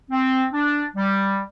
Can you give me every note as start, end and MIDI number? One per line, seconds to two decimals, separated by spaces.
0.10 0.44 60
0.53 0.84 62
0.96 1.39 55